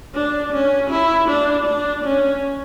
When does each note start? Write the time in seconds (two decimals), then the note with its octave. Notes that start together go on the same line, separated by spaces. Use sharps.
0.14 D4
0.52 C#4
0.90 E4
1.28 D4
1.66 D4
2.04 C#4